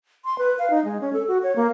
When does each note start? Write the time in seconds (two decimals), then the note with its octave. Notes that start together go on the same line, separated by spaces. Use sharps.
0.25 C6
0.38 B4
0.59 F5
0.70 D#4
0.85 G#3
1.01 C#4
1.13 A4
1.28 F#4
1.43 C#5
1.56 A#3